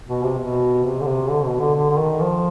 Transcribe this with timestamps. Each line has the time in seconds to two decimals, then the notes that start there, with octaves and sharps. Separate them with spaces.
0.08 B2
0.23 C3
0.38 B2
0.84 C3
1.01 D3
1.06 C3
1.30 D3
1.45 B2
1.60 D3
1.75 D3
1.90 D3
1.98 D#3
2.21 F3